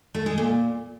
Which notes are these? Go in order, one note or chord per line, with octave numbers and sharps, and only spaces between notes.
A3
G#3
A#2